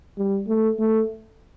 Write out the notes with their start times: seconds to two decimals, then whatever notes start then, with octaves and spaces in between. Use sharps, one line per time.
0.18 G3
0.47 A3
0.79 A3